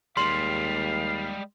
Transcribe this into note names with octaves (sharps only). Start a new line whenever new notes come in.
D#2 G3 G#3 F5 C6